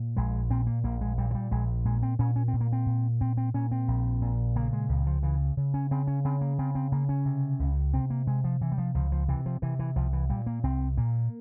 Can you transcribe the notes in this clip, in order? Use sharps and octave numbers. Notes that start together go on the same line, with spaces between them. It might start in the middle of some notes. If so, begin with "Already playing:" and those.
Already playing: A#2
A#1 G#3
A#2 C4
A#3
A#1 A#3
G#3
A#2 G3
F3
G3
A#1 G#3
A#2 G#3
C4
A#2 C#4
C#4
C4
A#2
A#3
C4
A#2
A#2 C4
C4
A#2 C#4
C4
A#1
A#2
C#3 A#3
G#3
C#2
F3
C#3 E3
C#3
C#4
C#3 C4
C#4
C#3 C4
A#3
C#3 C4
C4
C#3 A#3
C#4
C3
C#2
C3 C4
A#3
C3 G#3
F3
C3 E3
G3
F3
C#2 F3
F3
C3 E3
F3
C3 E3
E3
C2 F3
E3
A#2 G3
A#3
C2 C4
A#2 A#3